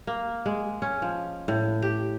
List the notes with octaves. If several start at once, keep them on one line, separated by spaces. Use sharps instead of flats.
A#3
G#3
C#4
F3
A2
G4